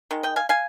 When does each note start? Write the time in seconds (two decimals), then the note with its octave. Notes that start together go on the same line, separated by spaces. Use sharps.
0.11 D#3 G#3
0.23 D#5 G5
0.36 F5 G#5
0.49 F5 G#5